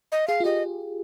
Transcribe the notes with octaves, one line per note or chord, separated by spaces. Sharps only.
D#5
G#4 F5
F4
G4 D#5